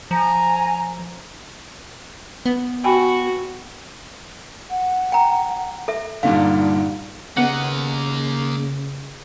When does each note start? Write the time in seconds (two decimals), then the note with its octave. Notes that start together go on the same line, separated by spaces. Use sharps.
0.11 F3 G#5 A#5
2.46 B3
2.84 F#4 G5 G#5 B5
4.70 F#5
5.12 G5 A#5
5.88 A4 E5
6.23 G2 A#2 D3 D#4 F5
7.37 C#3 A#3 B3 D#5 F#5